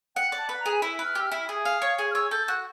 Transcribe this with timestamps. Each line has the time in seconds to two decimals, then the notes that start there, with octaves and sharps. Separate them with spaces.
0.16 F#5 G5
0.32 D5
0.38 A5
0.49 B4
0.60 A#5
0.66 G#4
0.82 E4
0.99 B4
1.04 F6
1.15 G4
1.20 E6
1.27 E4 F6
1.49 G#4 D#6
1.65 F5
1.82 C#5
1.98 G#4
2.11 F6
2.15 C#5 E6
2.31 A4 G6
2.48 F#4 F#6